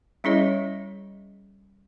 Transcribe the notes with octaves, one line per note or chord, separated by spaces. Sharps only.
G3 C#4 E4 G#4 C#5 D#5